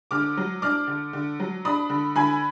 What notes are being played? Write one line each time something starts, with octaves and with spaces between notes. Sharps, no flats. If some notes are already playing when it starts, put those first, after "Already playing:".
D3 D6 F6
F#3
D4 D6 F6
D3
D3
F#3
D4 B5 D#6
D3
D3 G#5 B5